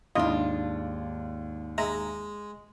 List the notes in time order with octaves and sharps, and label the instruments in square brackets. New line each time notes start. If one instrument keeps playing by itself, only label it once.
[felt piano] D#2 G#2 [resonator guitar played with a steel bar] D4 F4 [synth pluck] E4 D#5
[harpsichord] G#3 [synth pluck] E5 A#5